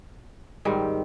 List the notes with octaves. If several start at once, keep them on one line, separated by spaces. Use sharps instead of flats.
G#2 D#3 G3 C4